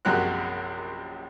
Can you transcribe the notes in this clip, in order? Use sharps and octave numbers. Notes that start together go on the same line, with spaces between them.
A#1 F#2 C3 G#3 F#4 F#6